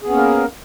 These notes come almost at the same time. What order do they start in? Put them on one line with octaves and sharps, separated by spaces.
G#4 B3 C#4 A#3 A#4